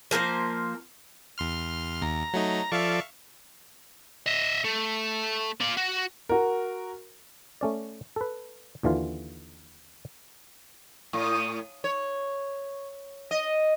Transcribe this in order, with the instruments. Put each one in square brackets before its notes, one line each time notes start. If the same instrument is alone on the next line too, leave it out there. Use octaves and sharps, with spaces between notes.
[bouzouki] F3 A#3 A#4 C5
[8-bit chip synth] E2 C6 F6
[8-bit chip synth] D#2 [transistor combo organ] A#5
[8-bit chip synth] F#3 A3 D#4
[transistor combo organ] F3 A4 D5 [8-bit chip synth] E5 F5 C#6
[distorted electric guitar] D#5 E5
A3
F4 D5
F#4
[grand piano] F#4 A#4
[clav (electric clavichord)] A3 C#4 D5
A4 B4
D#2 D3 E3 F4
[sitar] A2
C#5
D#5